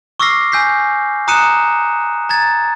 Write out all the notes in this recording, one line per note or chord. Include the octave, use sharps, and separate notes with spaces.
C#6 D6 E6 F6 A#6 C7
G#5 E6 G6 B6 C7
A#5 D#6 F#6 C#7 D#7 E7
A#5 G#6 A6